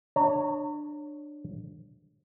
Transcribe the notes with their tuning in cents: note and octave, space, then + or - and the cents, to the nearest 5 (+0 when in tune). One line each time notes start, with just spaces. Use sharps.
D4 +15 C#5 +0 A#5 -35